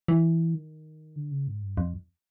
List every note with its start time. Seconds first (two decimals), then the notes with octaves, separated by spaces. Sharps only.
0.08 E3
0.54 D#3
1.16 D3
1.31 C#3
1.47 G#2
1.63 G2
1.77 F2